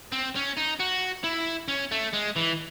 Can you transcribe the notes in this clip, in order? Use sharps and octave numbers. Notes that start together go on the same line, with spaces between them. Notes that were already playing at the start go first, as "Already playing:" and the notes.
C4
C#4
D#4
F#4
E4
C#4
A3
G#3
E3